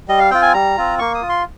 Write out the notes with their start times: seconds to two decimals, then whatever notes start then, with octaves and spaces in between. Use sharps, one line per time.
0.08 G3 D#5
0.19 F5
0.31 C4 F4 G5
0.42 G#5
0.54 G3 A#5
0.77 C4 F4
0.99 A#3 C#6
1.15 D#6
1.22 F4
1.29 C6